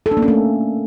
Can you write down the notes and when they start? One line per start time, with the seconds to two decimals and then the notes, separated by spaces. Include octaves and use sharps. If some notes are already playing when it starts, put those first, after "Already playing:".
0.06 A4
0.11 D4
0.17 A#3
0.22 C#4
0.28 A3